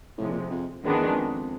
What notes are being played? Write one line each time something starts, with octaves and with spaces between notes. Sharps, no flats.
A2 C3 F3 G#3
A#2
F2
F2
F#2 D#3 G#3 B3 D4
E2
F2